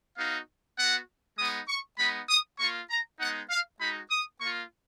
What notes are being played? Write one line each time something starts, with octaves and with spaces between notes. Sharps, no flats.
B3 D#4 F#4 F5
B3 F#4 F#5
G#3 B3 D#4 D#6
C#6
G#3 B3 D#4 B5
D#6
A#3 F4 C#6
A#5
G#3 B3 D#4 F#5
F5
G#3 D#4 F#4 B5
D#6
A#3 F4 C#6